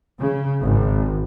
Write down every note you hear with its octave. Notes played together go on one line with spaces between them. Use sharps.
C#3
G#1